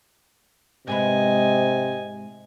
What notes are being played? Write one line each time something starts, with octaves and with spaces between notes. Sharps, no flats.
G#2 C3 G#3 B4 D#5 G#5